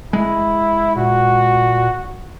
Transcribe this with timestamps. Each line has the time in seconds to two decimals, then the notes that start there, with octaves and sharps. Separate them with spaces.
0.13 G#3 E4
0.96 A#2 F#4